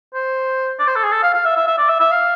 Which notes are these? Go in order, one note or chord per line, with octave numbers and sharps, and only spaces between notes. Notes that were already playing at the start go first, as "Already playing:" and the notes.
C5
D5
C5
A4
G#4
A4
F5
F5
E5
E5
E5
D5
E5
E5
F5